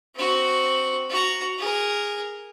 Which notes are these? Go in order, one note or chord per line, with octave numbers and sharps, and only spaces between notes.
C4 F#4
F#4 A#5
G#4 A#4